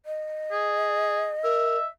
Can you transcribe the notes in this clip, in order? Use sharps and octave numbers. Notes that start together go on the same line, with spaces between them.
D#5
G#4
A#4 E5